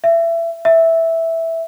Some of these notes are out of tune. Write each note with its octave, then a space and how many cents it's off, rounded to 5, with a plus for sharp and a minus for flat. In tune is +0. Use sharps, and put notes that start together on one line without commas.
E5 +25
E5 -5